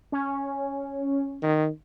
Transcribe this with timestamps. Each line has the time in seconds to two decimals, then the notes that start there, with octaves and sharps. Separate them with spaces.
0.12 C#4
1.42 D#3